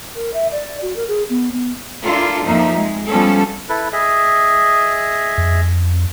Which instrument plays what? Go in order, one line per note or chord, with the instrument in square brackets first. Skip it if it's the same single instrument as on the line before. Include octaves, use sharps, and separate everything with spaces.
[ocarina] A#4
E5
D5
F#4
A#4
G#4
B3
B3
[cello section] D4 E4 F4 A4 A#4
F2 F3 A#3 D#4 E5
G#3
F3 G3 B3 C#4 A4
[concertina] E4 A4 B4
G#4 D#5 E5
[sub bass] F2